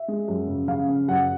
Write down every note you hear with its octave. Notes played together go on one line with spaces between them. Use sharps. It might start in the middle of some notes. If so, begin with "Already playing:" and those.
Already playing: E5
G#3
F#2
C#3
C#3 F5
C#3
F#2 F#5